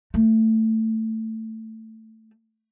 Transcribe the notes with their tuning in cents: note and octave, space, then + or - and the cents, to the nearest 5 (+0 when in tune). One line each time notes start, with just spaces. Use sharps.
A3 +15